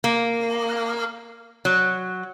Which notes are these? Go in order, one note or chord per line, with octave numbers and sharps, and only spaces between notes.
A#3
F#3